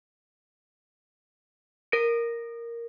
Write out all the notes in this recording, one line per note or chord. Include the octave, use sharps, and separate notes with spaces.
A#4 A#6 D7